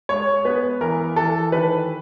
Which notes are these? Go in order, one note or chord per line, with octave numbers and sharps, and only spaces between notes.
G#3 C#5
B3 B4
E3 A#4
E3 A4
D#3 B4